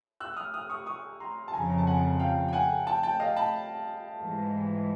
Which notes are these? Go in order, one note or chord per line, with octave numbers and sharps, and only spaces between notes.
E6 F#6
D#6 F6
D#6 F6
C#6 D#6
C#6 D#6
A#5 C6
A5
F2 C#3 F3 G#5 A#5
A#5
A5
F#5 G#5
F5 G5
G5
F#5 G#5
G5 A5
G5 A5
D#5 F5
A5 B5
G#2 E3 G#3